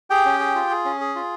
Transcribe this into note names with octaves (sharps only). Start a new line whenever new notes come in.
G4 G#4 G5
C#4
G#4
F4
G#4
C#4
G#4
F4